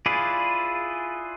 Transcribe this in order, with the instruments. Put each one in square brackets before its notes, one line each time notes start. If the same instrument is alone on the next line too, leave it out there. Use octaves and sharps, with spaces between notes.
[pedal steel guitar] E4 F4 G#4 B4 D5